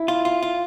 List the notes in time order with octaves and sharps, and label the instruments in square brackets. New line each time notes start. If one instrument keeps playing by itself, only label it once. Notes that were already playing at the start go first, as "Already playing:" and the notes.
Already playing: [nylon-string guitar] E4
[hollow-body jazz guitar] F4
F4
F4